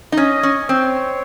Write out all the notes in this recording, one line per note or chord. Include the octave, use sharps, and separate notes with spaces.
D#4
C#4 D#5
C#4
C4 C#5